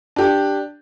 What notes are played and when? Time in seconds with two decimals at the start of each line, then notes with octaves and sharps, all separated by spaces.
0.16 D4 G4